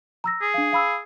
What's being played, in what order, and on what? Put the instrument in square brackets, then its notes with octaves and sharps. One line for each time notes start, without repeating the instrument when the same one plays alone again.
[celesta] A#5 E6 A#6
[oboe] G#4
[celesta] D4 F5
F5 B5 E6